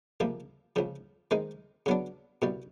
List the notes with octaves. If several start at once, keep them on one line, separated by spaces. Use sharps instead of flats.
C#2 C3 F3 A#3
C#2 C#3 F3
D#3 G#3 C4 D#4
C#3 F#3 B3 D4
C2 B2 G3